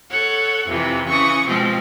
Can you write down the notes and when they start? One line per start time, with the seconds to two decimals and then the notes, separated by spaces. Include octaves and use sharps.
0.11 A4 C#5 F#5
0.68 F2 C3 E3
1.08 C#3 E3 C#6 D#6
1.47 B2 F3 G#3 C4 G4